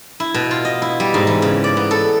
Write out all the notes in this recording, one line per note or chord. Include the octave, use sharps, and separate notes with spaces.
E4
B2
F4
D#5
E4
G3
G#2
E3
C#3
D5
B3
A4